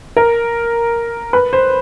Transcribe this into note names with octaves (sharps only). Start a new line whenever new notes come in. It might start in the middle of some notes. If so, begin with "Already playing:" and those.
A#4
B4
C5